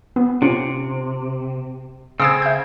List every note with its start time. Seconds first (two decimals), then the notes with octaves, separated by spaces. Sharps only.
0.16 B3
0.42 C3 C#4 F4
2.20 C#3 C4 D#6 E6 G#6
2.42 E5 G6